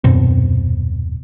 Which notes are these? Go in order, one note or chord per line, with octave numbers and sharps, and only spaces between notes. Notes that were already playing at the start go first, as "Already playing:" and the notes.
D#1 F#2 B2 C4